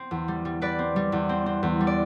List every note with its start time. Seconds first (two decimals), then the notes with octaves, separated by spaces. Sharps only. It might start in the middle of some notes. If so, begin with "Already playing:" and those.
Already playing: C4
0.11 E2
0.28 G3
0.45 G3
0.61 G3 B4 D5
0.79 C4
0.96 G3
1.12 E2
1.29 C4
1.46 C4
1.63 E2
1.80 G3
1.87 D5